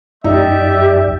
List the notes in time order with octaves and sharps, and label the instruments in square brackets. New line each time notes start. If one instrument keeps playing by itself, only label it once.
[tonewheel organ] F#2 [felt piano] D#4 [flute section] G4 D5 [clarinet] E5